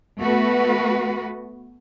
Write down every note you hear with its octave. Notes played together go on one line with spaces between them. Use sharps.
A3 B3 F#4 B4